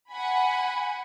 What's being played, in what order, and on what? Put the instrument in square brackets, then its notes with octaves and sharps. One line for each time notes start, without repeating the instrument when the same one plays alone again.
[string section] F#5 G#5 B5